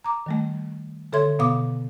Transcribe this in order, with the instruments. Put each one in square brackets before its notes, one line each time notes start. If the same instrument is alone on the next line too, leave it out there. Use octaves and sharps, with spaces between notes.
[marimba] A#5 D6
D#3 G3 A3
D3 A4 C#5 E5 C6 G#6
B2 B3 F5 D6 D#6